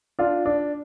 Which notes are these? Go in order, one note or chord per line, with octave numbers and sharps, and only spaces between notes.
D4 F4
D4